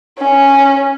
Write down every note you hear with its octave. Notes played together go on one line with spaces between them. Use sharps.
C#4